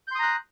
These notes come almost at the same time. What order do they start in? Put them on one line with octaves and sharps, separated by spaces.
G6 C6 D#6 A#5 F#6